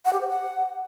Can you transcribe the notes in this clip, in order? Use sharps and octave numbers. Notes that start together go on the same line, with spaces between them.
F#5
G4
C5
F#5